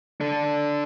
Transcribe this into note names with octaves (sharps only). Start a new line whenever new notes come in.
D4 A4